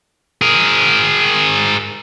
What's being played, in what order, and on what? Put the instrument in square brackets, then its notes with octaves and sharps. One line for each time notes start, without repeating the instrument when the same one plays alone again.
[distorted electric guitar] G#4 A#4